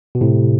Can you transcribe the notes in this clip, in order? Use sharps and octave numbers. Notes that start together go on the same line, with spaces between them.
B2
A2 C3